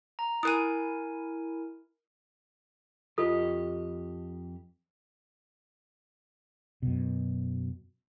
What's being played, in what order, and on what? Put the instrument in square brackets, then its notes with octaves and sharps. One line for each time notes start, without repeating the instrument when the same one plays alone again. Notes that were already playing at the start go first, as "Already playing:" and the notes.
[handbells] A#5
[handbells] E4 A#4 G#5 [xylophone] D#6 F#6 D#7
[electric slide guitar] F2 G4 D#5 [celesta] F4 A4 D#6
[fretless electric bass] F#2 B2